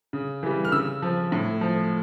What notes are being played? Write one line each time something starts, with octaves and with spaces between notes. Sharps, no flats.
C#3
E3 G3
F6
C#3 E6
F3
A2
F3